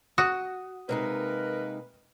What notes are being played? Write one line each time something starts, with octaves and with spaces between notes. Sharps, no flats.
F#4 D#6
C3 G#3 A#3 D#4 A#4 B4